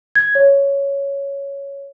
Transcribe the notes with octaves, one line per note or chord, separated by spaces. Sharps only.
G#6
C#5